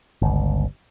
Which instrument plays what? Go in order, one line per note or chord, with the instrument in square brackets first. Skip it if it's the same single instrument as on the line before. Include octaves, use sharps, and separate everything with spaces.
[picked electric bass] G1 C#2